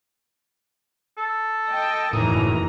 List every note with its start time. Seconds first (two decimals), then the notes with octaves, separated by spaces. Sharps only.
1.17 A4
1.67 D#5 G5
2.13 F#1 E2 A2 D#3 E3 A#5 D#6